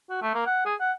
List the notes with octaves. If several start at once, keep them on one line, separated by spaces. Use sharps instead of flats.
F#4
A3
A#3
F#5
G#4
F#5